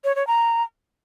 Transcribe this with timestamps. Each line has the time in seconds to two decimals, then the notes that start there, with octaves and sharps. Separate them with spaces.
0.04 C#5
0.16 C#5
0.27 A#5